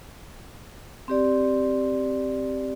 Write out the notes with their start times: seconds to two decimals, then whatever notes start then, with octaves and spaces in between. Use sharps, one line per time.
1.08 C4 G4 D5